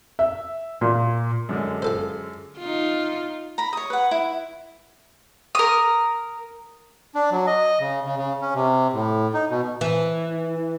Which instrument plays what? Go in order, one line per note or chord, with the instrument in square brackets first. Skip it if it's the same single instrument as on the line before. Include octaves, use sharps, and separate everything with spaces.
[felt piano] E5
A#2
[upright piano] F#2 D3 G#3
[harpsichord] F4 A4 C5
[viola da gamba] D#4 F4
[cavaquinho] A#5 B5
C#5 D#6
B4 F#5
E4
[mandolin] A#4 D#6
[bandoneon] D4
F#3
D#5
C#3
C#3
C#3
C#4
C3
A2
D#4
B2
[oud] E3